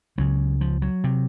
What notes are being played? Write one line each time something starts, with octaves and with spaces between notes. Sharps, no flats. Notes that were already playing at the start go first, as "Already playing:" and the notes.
C#2 C#3 F#3
F3
F#3
C3